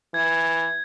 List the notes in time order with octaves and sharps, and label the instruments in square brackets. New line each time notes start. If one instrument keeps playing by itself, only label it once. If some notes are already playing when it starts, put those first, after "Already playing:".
[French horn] E3 [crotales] G#6